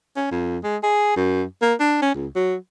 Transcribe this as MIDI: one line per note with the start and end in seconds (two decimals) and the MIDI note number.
0.17 0.26 61
0.31 0.58 41
0.64 0.77 56
0.83 1.16 68
1.17 1.44 42
1.62 1.74 58
1.80 2.01 62
2.02 2.12 61
2.15 2.28 37
2.35 2.56 54